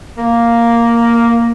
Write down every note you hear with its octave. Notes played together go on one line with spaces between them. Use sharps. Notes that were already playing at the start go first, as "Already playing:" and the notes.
A#3